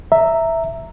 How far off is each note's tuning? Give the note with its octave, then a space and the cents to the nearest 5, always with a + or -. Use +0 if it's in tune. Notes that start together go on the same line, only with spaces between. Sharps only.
E5 +0 A#5 -15